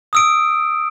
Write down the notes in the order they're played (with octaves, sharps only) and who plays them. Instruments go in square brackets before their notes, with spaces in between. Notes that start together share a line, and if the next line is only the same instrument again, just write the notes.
[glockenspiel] D#6 E6 D7